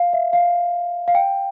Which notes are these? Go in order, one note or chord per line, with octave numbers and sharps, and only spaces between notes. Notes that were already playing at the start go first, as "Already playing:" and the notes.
Already playing: F5
E5
F5
F5
G5